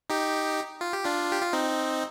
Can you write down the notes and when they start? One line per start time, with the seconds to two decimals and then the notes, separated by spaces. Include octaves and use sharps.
0.10 D#4 G4
0.81 F4
0.93 G4
1.05 D4 F4
1.32 G4
1.42 F4
1.53 C4 D#4